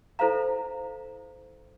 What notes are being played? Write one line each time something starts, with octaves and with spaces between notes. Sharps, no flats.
E4 A4 C5 F5 A#5